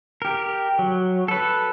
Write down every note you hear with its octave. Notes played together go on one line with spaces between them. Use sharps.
G4 A#4
F#3
A4 B4